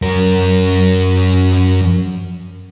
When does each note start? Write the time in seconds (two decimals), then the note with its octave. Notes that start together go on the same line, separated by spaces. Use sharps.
0.02 F#2 A#4